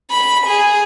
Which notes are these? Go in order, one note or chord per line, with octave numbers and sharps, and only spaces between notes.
B5
G#4